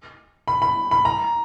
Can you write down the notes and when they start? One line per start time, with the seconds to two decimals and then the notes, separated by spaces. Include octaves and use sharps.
0.48 B5
0.62 B5
0.91 B5
1.05 A#5